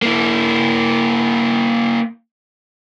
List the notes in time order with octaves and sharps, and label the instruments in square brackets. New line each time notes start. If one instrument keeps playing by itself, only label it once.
[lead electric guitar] A#3 E4